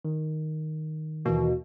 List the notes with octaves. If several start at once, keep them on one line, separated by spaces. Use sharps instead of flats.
D#3
D#2 B2 E3 A#3